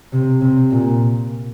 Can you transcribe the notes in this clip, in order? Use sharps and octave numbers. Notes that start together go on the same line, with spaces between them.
C3
C3
A#2